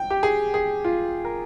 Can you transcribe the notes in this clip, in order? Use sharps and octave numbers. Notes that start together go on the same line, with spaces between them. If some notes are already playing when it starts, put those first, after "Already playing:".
Already playing: G5
G4
G#4
G#4
F4
A#4